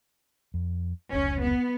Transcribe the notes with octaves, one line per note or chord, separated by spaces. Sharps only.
F2
F1 C#2 C#4
B3